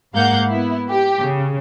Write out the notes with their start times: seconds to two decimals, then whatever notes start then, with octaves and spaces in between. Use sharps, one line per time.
0.14 G#2 A#3 F5 F#5 G6
0.49 B3 E4
0.90 G4
1.21 C#3